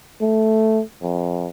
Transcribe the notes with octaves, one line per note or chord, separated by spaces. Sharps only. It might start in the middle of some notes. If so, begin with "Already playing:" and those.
A3
F2